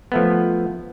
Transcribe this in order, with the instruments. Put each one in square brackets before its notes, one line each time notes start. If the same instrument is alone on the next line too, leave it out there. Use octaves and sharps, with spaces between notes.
[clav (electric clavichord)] F3 A3 B3